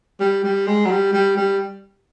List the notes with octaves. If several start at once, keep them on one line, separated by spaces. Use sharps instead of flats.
G3
G3
G#3
F#3
G3
G3
G3